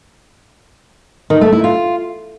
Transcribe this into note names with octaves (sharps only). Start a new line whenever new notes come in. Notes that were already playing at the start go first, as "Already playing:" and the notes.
D#3
A3
E4
F4